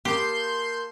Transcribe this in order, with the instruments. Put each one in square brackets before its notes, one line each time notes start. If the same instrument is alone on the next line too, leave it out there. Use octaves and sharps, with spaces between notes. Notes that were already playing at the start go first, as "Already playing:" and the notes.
[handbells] A#3 A#4 A5 [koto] G4 [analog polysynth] C6 G6